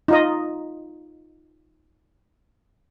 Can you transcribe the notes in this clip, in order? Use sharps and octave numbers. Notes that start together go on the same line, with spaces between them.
D#4 F4 D#5